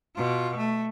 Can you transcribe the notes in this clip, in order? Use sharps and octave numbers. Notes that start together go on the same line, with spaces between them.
B2 F4
A3